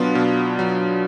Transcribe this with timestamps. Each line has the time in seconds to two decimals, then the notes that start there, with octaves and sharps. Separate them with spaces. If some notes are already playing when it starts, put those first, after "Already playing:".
Already playing: B2 F#3 B3 D4 F4
0.15 B2
0.59 F#3